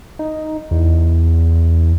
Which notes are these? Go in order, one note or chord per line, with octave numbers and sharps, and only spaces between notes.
D#4
E2